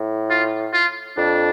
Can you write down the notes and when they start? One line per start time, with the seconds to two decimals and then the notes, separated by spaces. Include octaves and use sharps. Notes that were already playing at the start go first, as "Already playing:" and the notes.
Already playing: A2
0.30 F4
0.74 F4
1.17 F2 D4